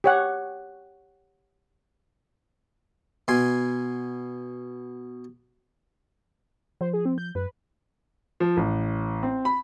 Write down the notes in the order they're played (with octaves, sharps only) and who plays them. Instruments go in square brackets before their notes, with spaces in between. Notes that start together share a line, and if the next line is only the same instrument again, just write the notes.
[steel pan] G4 C#5 F#5
[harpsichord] B2 G#5 C6
[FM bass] F3 [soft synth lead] C5
[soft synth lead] G#4
C4
G6
[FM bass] F#2 [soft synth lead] B4
[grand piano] F3
A1
C4
B5